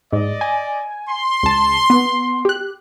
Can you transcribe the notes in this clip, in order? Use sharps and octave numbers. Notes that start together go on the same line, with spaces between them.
G#2 D5 D#5
G#5
C6
C#2 A5
B3
G4 F#6